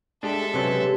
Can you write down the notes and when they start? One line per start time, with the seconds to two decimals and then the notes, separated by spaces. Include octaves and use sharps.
0.23 G#3 D4 G4 A4 D5 E5
0.54 C3 F#3 C#4 G4 B4